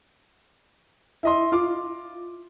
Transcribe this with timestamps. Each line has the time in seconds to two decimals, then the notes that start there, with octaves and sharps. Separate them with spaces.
1.23 E4 D#5 C6
1.52 F4 D6